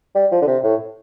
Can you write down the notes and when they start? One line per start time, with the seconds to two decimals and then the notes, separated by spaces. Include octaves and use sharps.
0.15 G3
0.32 F3
0.42 D3
0.47 C3
0.64 A2